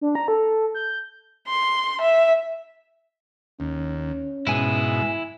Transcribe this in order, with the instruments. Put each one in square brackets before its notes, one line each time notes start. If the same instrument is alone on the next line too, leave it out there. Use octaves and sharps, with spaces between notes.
[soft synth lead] D4
A#5
A4
G6
[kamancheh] C6
E5
[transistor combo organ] D#2 [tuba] C#4
[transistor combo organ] G#2 B2 [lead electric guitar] E4 G#5